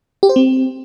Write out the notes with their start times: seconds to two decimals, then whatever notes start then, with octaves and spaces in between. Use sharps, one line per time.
0.23 G4
0.29 C5
0.36 C4